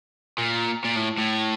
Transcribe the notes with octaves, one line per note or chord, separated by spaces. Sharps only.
A#2
A#2
A2
A2